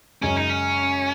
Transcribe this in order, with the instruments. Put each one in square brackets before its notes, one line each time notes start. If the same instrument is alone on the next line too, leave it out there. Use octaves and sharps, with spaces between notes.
[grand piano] F#2 C#3 G#3 [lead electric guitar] C#4
[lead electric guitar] D#4
C#4